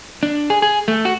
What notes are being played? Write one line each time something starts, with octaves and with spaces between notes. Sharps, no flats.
D4
G#4
G#4
A3
F#4